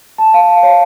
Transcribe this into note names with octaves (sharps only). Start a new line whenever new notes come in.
A5
F5
F5
C#5